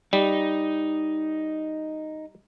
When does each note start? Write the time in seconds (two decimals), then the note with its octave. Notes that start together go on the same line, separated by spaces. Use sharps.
0.13 G3 D#4